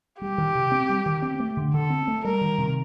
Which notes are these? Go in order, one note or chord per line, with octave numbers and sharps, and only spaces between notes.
G3 G4
D#3
C3
C4
G3
D#3
C4
A3
D3
D3 A4
C4
A3
G3 A#4
D#3
C3